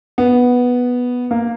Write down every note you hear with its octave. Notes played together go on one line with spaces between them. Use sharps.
B3
A#3